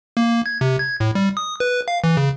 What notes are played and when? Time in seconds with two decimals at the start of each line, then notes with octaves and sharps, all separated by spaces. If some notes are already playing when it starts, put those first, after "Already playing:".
0.17 A#3
0.46 G#6
0.61 C3
0.79 G#6
1.00 A2
1.15 G3
1.37 D#6
1.60 B4
1.88 F5
2.04 E3
2.17 C#3